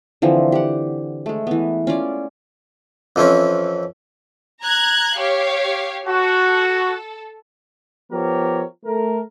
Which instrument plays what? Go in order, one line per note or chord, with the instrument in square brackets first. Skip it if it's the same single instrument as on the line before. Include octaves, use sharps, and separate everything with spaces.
[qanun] D3 E3 F3 C4
G4 F#5
G#3 A3
E3 B3
C#4 F4 D5
[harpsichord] F2 E3 C4 C#4
[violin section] A#5 F#6 G#6
G4 C#5 F5
[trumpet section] F#4 [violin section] A4
[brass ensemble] F3 B3 G4 A#4 C#5
A3 A#4